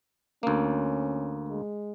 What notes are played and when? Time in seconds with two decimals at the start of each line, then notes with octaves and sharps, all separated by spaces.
0.43 D2 A#3 C#4
1.48 G#3